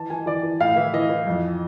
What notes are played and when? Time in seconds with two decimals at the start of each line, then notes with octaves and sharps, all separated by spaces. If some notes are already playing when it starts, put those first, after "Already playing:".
Already playing: E3 A5
0.10 E3 G#5
0.26 E3 D5
0.43 E3
0.60 A2 F5
0.76 E3 E5
0.93 E3 D#5
1.09 E3
1.26 F2